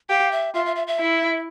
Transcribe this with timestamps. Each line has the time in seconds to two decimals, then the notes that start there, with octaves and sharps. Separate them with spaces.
0.09 G4 F5
0.32 E5
0.54 F4 E5
0.66 E5
0.76 E5
0.87 E5
0.99 E4